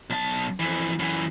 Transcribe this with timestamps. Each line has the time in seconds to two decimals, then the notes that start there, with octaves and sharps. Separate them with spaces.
0.10 B1 A5
0.60 F2 E3
0.99 F#2 E3